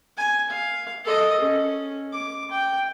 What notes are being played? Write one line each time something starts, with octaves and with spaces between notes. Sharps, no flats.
G#5
F5
A4 D#5
C#4
D6
G5